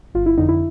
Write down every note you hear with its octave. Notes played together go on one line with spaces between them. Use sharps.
G1 F4
E4
F2 D3 D#4
E4